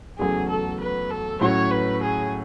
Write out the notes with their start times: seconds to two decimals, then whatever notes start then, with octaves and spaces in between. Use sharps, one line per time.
0.19 E2 C#3 F#3 A3 G#4
0.49 A4
0.80 B4
1.10 A4
1.41 A2 F#3 C#4 F#4 C#5
1.71 B4
2.02 G#4